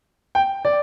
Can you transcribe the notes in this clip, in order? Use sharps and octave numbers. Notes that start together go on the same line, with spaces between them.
G5
D5